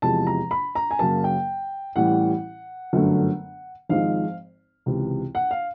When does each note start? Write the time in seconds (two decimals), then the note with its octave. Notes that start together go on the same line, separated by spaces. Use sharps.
0.02 E2 C3 F3 G#3 A5
0.27 A#5
0.51 B5
0.75 A#5
0.91 G#5
0.99 F#2 C#3 F#3 A#3 A5
1.24 G5
1.96 A1 A2 E3 G3 F#5
2.93 G1 F#2 D3 F#3 A3
3.89 G#1 G#2 F3 G#3 F5
4.86 C#2 C3 E3
5.35 F#5
5.51 F5